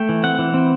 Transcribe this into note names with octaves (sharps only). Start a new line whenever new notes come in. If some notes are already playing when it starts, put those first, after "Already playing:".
Already playing: A3 G5
E3
C4 F#5
E3
C4